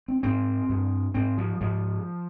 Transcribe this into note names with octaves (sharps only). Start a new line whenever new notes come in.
C4
G#2 C4
G2
G#2 C4
F3
G#2 F3